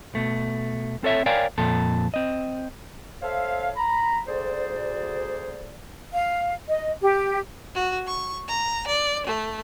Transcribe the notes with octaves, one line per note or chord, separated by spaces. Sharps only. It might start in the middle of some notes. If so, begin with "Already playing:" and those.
B2 A3
C4 A4 C#5 E5
A#4 C#5 D5 F5 G5 G#5
F2 A#2 A4
C4 D#5
A4 C5 C#5 E5 F5
A#5 B5
D2 G#4 C5 D5
F5
D#5
G4
F#4
C#6
A#5
D5
A3